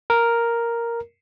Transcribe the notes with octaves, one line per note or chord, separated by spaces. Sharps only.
A#4